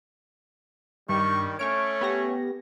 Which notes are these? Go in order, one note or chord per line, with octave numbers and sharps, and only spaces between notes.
G2 D#3 G3 C#6
A3 C#4 C#5 C#6 F6 D7
B3 G4 A#6